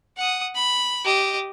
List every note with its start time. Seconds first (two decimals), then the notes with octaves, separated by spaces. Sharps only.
0.18 F#5 D#6
0.55 B5
1.05 G4 D#5